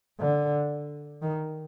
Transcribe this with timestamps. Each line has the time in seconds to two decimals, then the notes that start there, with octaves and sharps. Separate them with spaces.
0.20 D3
1.22 D#3